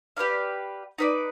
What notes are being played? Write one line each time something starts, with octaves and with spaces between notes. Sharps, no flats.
G4 B4 D5 F5
D#4 B4 D5